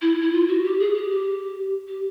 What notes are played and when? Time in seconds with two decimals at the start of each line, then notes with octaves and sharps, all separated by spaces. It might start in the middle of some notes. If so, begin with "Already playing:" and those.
0.02 E4
0.22 E4
0.33 F4
0.48 F#4
0.63 G4
0.80 G#4
0.95 G4
1.10 G4
1.88 G4